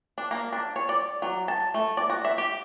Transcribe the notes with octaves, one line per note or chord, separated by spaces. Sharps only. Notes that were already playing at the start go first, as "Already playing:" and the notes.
D4
A#3
D4
C#5
D5
F#3
A5
A3
D5
F#4
E5
G4